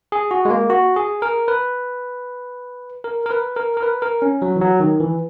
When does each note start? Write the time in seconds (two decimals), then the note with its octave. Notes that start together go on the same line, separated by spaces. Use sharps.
0.12 G#4
0.31 F#4
0.45 G#3
0.50 A#3
0.70 F#4
0.96 G#4
1.22 A#4
1.48 B4
3.04 A#4
3.26 A#4
3.31 B4
3.56 A#4
3.77 A#4
3.83 B4
4.02 A#4
4.22 C#4
4.42 F#3
4.56 E3
4.61 F#3
4.80 D#3
5.00 E3